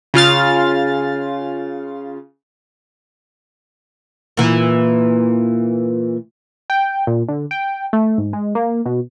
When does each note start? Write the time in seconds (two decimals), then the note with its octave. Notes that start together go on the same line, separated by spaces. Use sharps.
0.14 C#3 F4 F6 A6
4.37 A#2 E3
6.70 G5
7.07 A#2
7.29 D3
7.51 G5
7.93 A3
8.18 G#2
8.33 G#3
8.55 A#3
8.86 B2